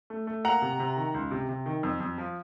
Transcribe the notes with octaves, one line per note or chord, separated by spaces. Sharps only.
A3
A3
A#3 F#5 A#5
C3
C3
D#3
C#2
C3
C3
D#3
F2
F2
F3